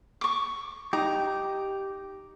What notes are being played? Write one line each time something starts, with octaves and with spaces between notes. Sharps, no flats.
C#6 D6
D#4 G4 A#5